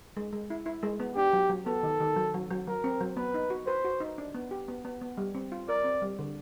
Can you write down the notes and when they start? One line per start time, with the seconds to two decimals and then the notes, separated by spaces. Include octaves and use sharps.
0.17 G#3
0.33 G#3
0.50 E4
0.66 E4
0.83 G#3
1.00 B3
1.16 D4 G4
1.33 F#3
1.50 F#3
1.66 B3 A4
1.83 D#3
2.00 D#3
2.16 F#3
2.34 F#3
2.51 F#3
2.67 F#3 A#4
2.84 C4
3.01 F#3
3.17 B3 B4
3.34 D#4
3.50 F#4
3.67 B4 C5
3.85 F#4
4.00 D#4
4.18 D4
4.35 B3
4.51 G4
4.68 B3
4.85 B3
5.01 B3
5.18 G3
5.35 C4
5.52 F4
5.69 A#4 D5
5.84 C4
6.02 G3
6.19 D3